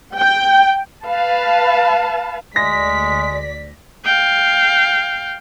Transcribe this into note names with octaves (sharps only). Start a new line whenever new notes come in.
G5
B4 F5 A5
D2 G#3 D5 A#6 B6
F5 G5